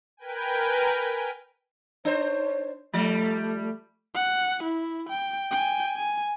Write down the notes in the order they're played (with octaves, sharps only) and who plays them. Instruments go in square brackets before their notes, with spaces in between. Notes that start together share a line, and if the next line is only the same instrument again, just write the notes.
[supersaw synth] A#4 B4 G5 G#5
[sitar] D4 C5 [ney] C#5
[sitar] F3 G3 [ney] A3
[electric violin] F#5
E4
G5
G5 G#5
G#5